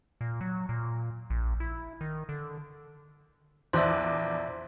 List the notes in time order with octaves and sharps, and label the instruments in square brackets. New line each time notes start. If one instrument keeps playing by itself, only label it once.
[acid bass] A#2
F#3
A#2
A#1
E4
D#3
D3
[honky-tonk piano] A#1 E2 F#6 [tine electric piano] C5 D5 E5